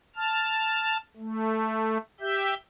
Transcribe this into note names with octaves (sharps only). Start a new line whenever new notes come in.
A5 F6
A3
G4 E5 G6